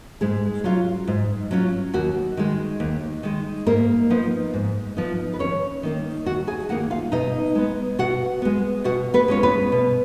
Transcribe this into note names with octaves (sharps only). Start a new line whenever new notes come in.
G#2 G#3 G#4
F#3 C#4 F4
G#2
F#3 C#4 F4
D#2 F#4
D#3 G#3
D#2
D#3 G#3
G#2 A#3 A#4
F3 B3 D#4
G#2
F3 B3 D#4
B4
D#2 C#4 C#5
D#3 A#3 D#4
D#2 F#4 F#5
G#4 G#5
D#3 A#3 D#4 F#4 F#5
F4 F5
B2 D#4 D#5
G#3 B3
B2 F#4 F#5
G#3 B3
B2 F#4 F#5
B3 B4
G#3 C#4 F4 C#5
B3 B4
B2